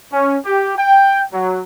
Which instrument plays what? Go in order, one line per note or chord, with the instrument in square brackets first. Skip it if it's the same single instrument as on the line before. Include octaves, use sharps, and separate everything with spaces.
[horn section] C#4
G4
G5
F#3